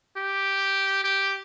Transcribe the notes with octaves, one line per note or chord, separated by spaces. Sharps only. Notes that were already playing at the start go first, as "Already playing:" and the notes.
G4
G4